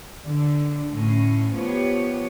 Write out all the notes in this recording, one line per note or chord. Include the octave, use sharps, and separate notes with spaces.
D3
A2 C#4
F3 B3 G4 C#5